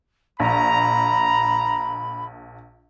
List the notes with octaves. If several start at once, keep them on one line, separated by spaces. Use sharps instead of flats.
A#1 A#5 B5